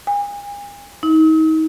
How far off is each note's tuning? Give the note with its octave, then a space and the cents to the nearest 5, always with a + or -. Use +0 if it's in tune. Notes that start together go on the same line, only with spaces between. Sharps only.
G#5 -40
D#4 +30